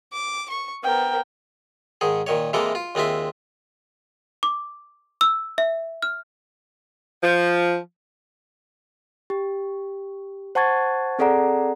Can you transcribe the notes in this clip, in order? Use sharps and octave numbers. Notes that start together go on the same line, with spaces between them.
D6
C#6
B3 A#4 C5 G5
G#2 D#3 G#4
A#2 D#3 C#5
C3 E3 G#3 A#3 A4 A#4
F4
D#2 G#3 C4 F4 E5
D6
E6
E5
F6
F3
G4
C5 F#5 A5 C#6 G#6 A6
C4 G#4 A4 D5 F#5 A#5